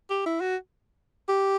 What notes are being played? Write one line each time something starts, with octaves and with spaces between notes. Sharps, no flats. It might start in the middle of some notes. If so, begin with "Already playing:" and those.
G4
E4
F#4
G4